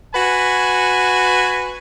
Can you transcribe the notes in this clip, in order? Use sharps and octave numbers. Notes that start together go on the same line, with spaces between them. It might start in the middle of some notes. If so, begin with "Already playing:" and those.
F#4 B4 G#5